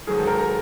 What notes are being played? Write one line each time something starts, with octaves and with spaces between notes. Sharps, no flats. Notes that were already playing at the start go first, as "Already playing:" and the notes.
G#2 D#3 F#3 G#4
A4
A#4
A#4